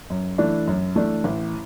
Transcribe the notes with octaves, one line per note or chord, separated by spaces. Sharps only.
F#2
E3 A3 D4
F#2
E3 A3 D4
A1